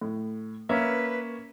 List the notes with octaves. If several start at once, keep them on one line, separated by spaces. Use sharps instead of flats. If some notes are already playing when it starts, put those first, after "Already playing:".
A2
A#3 C#4 B4 E5